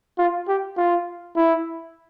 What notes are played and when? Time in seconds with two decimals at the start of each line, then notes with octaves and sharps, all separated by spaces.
0.18 F4
0.48 G4
0.77 F4
1.36 E4